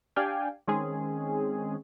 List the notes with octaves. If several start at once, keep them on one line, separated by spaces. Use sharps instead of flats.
D4 G4 D5 F5 G5 G#5
D#3 G#3 C4 C#4 G#4